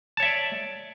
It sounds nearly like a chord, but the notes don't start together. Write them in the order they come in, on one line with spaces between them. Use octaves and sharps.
A5 C#5 E5 D5